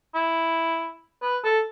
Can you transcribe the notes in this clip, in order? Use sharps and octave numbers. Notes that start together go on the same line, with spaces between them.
E4
B4
A4